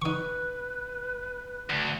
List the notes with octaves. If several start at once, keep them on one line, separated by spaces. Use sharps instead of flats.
D#4 B4 C#6
D2